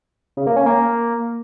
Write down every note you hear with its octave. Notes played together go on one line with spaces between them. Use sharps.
C#3
A#3
C#4
A#3